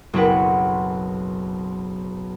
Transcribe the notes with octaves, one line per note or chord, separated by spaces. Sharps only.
F#1 B1 C4 B4 F#5